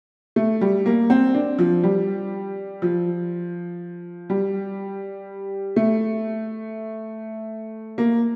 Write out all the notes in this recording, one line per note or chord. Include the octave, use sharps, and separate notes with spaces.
A3
G3
A#3
C4
D4
F3
G3
F3
G3
A3
A#3